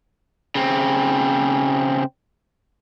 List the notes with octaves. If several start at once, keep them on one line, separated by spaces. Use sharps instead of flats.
C#3 C4